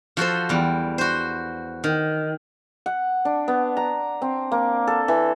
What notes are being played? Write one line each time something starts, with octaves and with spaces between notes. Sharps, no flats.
F3 F#4 A4 C5
E2 G3
F#4 C5
D#3
F#5
D4
B3
A#5
C4
A#3
A4
E3